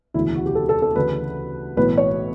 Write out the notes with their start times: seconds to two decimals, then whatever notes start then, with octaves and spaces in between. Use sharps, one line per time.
0.14 E1 D2 C#3 E3 E4
0.35 F#4
0.46 G4
0.55 A4
0.69 A4
0.82 A4
0.96 D2 C#3 E3 B4
1.77 B1 A2 E3 B4
1.98 C#5